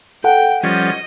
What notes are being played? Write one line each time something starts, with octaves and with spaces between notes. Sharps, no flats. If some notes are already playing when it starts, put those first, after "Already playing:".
A4 F#5 G5
F3 G3 C#4 D#5